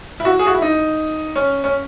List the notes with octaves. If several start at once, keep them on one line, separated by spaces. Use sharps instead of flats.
E4
F#4
G#4
F#4
E4
D#4
C#4
C#4